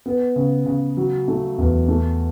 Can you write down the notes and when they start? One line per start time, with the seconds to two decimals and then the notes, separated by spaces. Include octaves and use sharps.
0.06 B3
0.36 C#3
0.66 C#3
0.97 F#3
1.28 A3
1.58 E2
1.88 A3